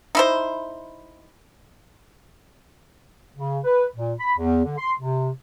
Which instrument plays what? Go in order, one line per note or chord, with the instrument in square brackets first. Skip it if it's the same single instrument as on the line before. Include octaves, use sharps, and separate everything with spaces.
[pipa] D#4 E4 C5
[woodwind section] C#3
B4
A#2
B5
E2
D3
C6
C3